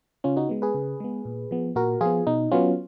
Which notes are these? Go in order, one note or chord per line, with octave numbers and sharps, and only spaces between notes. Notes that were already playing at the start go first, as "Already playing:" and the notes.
C#3 C#4 F4
D#4 F#4
G#3 B3
G#4 B4
C#3
G#3 B3
A#2
F3 B3
A#2 F#4 A#4
F3 B3 F4 G#4
B2 D#4
F#3 B3 C#4 F4